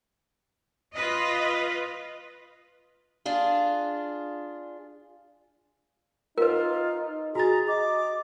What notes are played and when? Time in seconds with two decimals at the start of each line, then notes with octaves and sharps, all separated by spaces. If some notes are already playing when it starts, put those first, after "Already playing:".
0.94 F4 B4 D#5
3.25 D4 F4 G#4
6.38 D#4 F4 A#4 B4
7.35 F#4 G#4 A#5 A6
7.68 D#5 D6